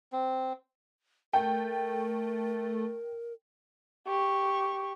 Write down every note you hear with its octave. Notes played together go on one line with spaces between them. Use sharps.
C4
A3 A#4 G5
G4 C#6